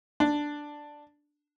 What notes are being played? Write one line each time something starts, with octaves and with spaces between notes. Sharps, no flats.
D4